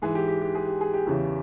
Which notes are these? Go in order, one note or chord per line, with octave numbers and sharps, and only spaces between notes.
G#2 E3 G#4
G4
G4
G4
G#4
G4
G#4
G4
E2 C#3 E3